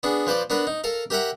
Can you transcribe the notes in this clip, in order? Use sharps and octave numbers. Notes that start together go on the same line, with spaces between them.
B3 D4 G#4
F3 B4 C5 D5
B3 D4 A#4 B4
D#4
A4 A#4 F5
G4 A#4 E5 F#5 A#5